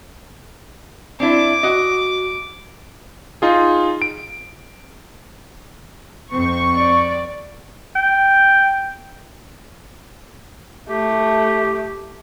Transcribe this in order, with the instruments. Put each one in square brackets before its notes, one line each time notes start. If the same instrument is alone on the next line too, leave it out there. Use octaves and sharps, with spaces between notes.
[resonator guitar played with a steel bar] C4 D4 E4 [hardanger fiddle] D6
[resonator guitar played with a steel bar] F#4 D#5
[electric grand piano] D#4 F4 G#4
D7
[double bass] F2 C4 [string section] C#6
[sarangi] D5
[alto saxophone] G5
[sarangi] A3 [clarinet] G4